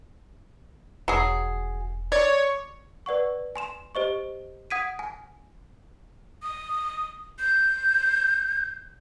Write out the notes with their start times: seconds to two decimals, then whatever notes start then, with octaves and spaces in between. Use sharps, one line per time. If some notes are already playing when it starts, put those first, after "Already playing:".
1.08 E1 F#3 G#4
2.12 C#5 D5
3.06 B4 D5 F#5 C#6
3.56 G#5 C6 E7
3.95 G4 C5 D#5 C#6
4.70 F#5 D#6 G#6 B6 D7 D#7
4.99 G#5
6.43 D#6
7.39 G6